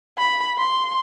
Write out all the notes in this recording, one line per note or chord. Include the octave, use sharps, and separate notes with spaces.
B5
C6